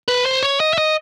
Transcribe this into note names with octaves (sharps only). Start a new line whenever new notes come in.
B4
C5
C#5
D#5
E5
D#5